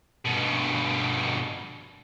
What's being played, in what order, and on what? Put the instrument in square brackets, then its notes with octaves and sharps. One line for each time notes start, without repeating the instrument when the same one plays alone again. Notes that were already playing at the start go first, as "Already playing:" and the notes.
[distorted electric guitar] G2 B2